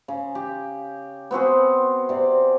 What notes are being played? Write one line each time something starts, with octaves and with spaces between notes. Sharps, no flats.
C#3
G4
B3 C4 F#4 G#4
C3 D5